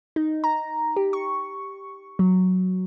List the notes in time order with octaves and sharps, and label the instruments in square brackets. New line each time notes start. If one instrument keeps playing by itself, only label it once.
[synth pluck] D#4
A#5
G4
C#6
F#3